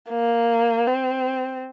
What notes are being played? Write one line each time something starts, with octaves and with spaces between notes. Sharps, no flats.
A#3
C4